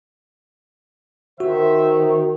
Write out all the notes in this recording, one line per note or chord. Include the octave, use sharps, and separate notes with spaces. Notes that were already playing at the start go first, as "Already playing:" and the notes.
D#3 F#4 C5 E5